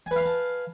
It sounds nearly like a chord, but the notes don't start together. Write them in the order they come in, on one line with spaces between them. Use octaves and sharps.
G#5 B4 F5 B5 A5